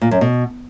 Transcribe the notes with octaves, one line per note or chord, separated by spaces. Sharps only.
A#2
F#2
B2